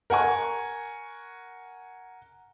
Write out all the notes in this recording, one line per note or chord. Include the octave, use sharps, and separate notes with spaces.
A#4 F#5 G#5 C#6